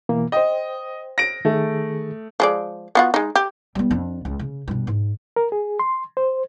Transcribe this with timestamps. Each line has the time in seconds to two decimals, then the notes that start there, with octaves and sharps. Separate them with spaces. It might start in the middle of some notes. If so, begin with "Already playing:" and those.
0.09 B2 E3 A#3
0.32 C5 D#5 G5
1.18 A#6 D7
1.45 D#3 A3 G#4
2.40 F3 G#3 D5
2.95 B3 F4 F#4
3.14 G#3 D#4
3.36 G4
3.75 G3 B3
3.91 F2 D4
4.25 C#2
4.39 C#3
4.68 G2 B2
4.87 G#2
5.36 A#4
5.52 G#4
5.79 C6
6.17 C5